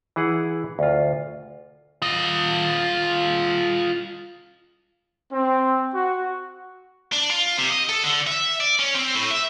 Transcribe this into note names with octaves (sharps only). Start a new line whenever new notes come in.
E3 E4 G#4 F#5
D2 F4
F4 D#5
C4
F#4
D4
F4
C3
D#5
A4
D3
E5
D5
C#4
C4
A2
E5